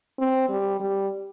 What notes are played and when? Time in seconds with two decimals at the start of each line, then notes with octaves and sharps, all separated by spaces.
0.19 C4
0.49 G3
0.80 G3